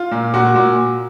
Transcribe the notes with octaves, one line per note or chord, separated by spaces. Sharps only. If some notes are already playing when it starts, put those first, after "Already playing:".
Already playing: F4
A#2
A#2 F#4
A#2